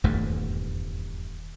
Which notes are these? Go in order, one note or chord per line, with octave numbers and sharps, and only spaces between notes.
D#1 E2 G2 A3